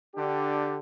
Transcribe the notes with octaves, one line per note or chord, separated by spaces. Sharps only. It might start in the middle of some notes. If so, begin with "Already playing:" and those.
D3 D4 G4